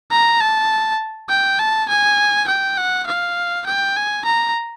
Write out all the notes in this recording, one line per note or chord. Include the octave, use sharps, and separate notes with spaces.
A#5
A5
G5
A5
G#5
G5
F#5
F5
G5
G#5
A#5